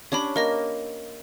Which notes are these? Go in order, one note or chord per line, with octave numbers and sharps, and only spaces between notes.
C#4 D4 G4 C#5 B5
A#3 A#4 D#5 A#6